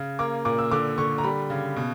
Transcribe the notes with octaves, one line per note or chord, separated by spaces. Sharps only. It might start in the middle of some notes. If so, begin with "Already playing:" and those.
Already playing: C#3
A#3 D6
A#2 D6
E6
D3 D6
D3 C#6
A#5
G3 B5
C#3
B2